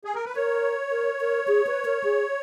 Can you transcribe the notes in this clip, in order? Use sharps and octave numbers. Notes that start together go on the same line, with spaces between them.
G#4
A#4
B4
A#4 C#5
A#4
A#4
G#4
B4
A#4
G#4